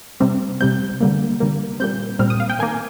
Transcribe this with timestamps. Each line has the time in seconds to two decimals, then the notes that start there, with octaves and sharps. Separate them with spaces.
0.20 C3 G3 C4
0.61 C3 G3 C4 G6
1.00 D3 G3 A#3
1.40 D3 G3 A#3
1.80 A#2 G3 C4 G6
2.19 A#2 G3 C4 F6
2.30 D#6
2.40 F5
2.50 G5
2.59 D#3 A#3 G#5